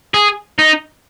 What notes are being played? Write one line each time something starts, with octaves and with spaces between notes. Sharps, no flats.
G#4
D#4